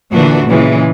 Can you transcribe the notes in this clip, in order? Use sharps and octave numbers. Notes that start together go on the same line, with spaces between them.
A#2 D3 E3 D4 F#4
A#2 C#3 E3 G#3